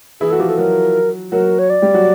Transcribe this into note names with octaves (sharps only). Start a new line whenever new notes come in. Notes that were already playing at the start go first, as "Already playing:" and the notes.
E3 E4 G#4
F#4 A4
F3 F4 G4
A4
F#3 F#4 A#4
F#3 F#4 A#4
C#5
D5
G3 G4
F#3 F#4